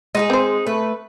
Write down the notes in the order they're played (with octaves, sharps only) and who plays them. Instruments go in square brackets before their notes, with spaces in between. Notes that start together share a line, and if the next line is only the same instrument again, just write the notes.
[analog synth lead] G#3 [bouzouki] D#4 F#4 G#4
[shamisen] C4 C5
[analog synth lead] A3 [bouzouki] B4